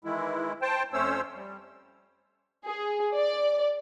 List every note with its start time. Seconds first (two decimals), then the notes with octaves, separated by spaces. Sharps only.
0.04 D#3 E3 G#3 E4
0.62 C5 G5 A5
0.93 F2 A3 C#4 C5 C#5 E6
1.35 G3
2.65 G#4
3.14 D5